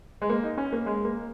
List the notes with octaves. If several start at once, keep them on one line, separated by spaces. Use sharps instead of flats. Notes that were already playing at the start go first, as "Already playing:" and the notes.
G#3
A#3
D#4
C#4
A#3
G#3
A#3